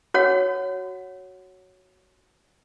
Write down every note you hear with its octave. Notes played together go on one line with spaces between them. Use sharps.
F#4 C#5 F#5